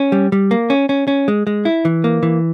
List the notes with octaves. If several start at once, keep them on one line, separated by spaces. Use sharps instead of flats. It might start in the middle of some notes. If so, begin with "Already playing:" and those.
Already playing: C#4
G3
G3
A#3
C#4
C#4
C#4
G#3
G#3
E4
E3
A#3
E3